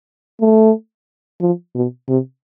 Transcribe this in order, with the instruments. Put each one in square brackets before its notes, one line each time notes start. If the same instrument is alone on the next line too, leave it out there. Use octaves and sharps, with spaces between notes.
[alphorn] A3
F3
B2
C3